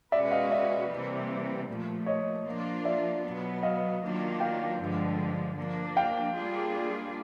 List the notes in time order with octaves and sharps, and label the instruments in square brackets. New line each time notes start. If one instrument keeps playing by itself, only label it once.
[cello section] B2 G#3 C#4 F#4 B4 [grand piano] D5 E5
[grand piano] D#5 F5
D5 E5
[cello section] C3 E3 G3 A#3
A#2 F3 A3
[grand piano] C#5 D#5
[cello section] F3 A#3 D4 F4
[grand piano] D5 E5
[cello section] B2 F#3 B3
[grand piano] D#5 F5
[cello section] D#3 F#3 A#3 D4 F4
[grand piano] F5 G5
[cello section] G2 D3 F3 G#3
F3 A#3 D4
[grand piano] F5 G5
[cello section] G3 A#3 D4 F4 G#4